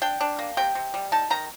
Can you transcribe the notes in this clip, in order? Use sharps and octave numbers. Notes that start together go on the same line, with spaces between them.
D4 G5
D4
A#3
C3 G5
C3
G3
D#4 A5
D#3 A#5